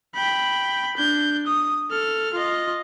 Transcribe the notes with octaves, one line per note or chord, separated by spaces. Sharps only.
G5 B5
D4 G6
D#6
A4 F6
F4 D#5